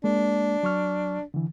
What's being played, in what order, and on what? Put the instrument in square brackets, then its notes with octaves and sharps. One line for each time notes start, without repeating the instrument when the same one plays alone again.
[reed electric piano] G#3 A#3 [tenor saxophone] D4
[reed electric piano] F#3 C#6 F6
D3 E3